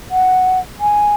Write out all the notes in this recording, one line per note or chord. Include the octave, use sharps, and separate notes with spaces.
F#5
G#5